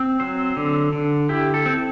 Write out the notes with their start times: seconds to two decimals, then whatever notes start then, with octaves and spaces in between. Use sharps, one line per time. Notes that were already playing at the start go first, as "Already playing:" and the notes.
Already playing: C4
0.20 F#3 C5
0.57 D3
0.92 D3
1.29 E4 G4
1.54 A4
1.66 C4